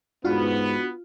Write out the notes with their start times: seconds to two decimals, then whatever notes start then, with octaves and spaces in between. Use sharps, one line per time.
0.25 G#2 B3 D4 F4 F#4